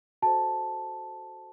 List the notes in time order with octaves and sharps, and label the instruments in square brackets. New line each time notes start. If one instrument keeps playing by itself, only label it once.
[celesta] F#4 A4 C5 A5